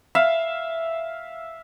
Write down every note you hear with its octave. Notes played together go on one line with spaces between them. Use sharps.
E5 F5